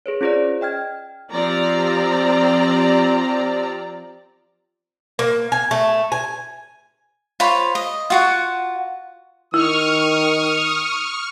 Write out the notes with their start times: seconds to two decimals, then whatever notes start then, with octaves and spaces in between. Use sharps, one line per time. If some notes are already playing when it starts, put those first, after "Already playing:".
0.06 G#4 B4 C#5
0.21 C#4 F4 G#4 C5 D5
0.61 D#5 G5 F6 G#6
1.33 F3 C4 G4 D5 A#5
5.19 A#3
5.52 G#5
5.71 A3
6.12 G#5
7.40 F4 C5 C#5 B5
7.75 D#5
8.10 F4 F#4 F#5
9.54 D#3 E4 C#6 D#6 F6